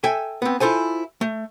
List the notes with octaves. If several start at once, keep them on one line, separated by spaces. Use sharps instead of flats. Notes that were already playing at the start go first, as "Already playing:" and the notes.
A4 E5 G5 G#5
B3 C4
E4 F4 A4 C5 G#5
A3